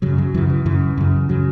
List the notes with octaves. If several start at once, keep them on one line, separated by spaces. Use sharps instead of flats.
F#2 C#3 F#3
F#3
F#2 C#3 E3
E3
F#2 C#3 E3
F#2 C#3
C#3 F#3